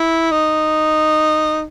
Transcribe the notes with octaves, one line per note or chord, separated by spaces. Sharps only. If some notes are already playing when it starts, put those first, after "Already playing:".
Already playing: E4
D#4